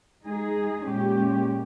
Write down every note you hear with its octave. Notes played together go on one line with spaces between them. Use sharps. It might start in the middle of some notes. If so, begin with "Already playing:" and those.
G#3 D#4 G#4
A#2 G#3 C#4 G4